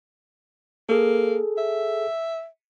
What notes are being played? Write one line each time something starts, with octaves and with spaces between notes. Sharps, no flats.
A#3 G#4 A4
E5